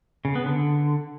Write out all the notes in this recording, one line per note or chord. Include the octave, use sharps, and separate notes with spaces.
C#3
B3
D3